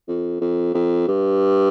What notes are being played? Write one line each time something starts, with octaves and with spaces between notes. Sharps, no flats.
F2
F2
F2
G2